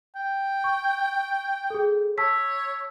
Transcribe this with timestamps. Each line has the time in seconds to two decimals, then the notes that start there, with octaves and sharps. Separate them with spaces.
0.16 G5
0.64 C#6
1.70 G#4 A4
2.18 C#5 A5 E6 B6